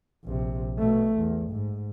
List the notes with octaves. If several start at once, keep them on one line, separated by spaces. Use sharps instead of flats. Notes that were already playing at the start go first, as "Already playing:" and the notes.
A#1 C3
B2 A3
E2
G#2